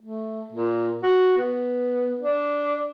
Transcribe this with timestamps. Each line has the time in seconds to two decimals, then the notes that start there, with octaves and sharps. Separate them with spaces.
0.01 A3
0.52 A#2
1.03 F#4
1.37 B3
2.20 D4